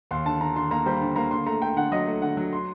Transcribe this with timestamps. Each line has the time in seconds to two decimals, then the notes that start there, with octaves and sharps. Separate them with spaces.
0.11 D#2 C6
0.25 D3 A5
0.40 D3 A#5
0.56 D3 C6
0.71 A#3 A#5
0.86 G3 C5
1.01 D3
1.16 A#3 A#5
1.31 D3 C6
1.47 A3 A#5
1.61 A3 G5
1.76 D3 F#5
1.92 F#3 D#5
2.07 A3
2.22 D3 F#5
2.37 F#3
2.53 C6